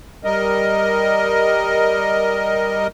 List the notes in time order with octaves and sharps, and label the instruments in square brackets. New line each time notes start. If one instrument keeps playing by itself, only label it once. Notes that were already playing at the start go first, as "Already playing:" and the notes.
[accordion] G3 A#4 D#5